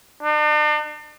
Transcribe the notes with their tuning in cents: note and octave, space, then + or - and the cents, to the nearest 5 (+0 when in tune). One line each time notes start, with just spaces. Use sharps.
D4 +45